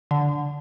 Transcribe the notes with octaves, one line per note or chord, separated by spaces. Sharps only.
D3